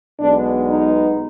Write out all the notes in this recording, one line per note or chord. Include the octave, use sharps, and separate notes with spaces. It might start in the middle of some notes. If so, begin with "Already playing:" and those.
B1 B2 G#3 B3 D4
D#4